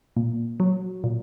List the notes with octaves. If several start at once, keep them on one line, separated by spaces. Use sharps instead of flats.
A#2
F#3
A#2